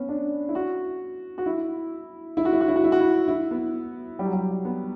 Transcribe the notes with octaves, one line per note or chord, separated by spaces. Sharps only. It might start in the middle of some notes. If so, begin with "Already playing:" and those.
Already playing: B3 C#4
D4
E4
F#4
F#4
E4
E4
F#4
E4
F#4
E4
F#4
E4
F#4
E4
E4
B3
G3
F#3
G3
B3